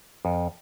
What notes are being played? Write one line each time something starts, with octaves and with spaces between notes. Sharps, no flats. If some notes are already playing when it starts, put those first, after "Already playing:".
F2